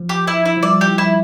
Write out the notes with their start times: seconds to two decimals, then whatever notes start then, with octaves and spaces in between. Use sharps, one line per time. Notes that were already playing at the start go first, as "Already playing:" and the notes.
Already playing: F3
0.09 G4
0.27 E4
0.45 E4
0.57 F3
0.62 G3 D5
0.81 G4
0.87 E4
0.98 E4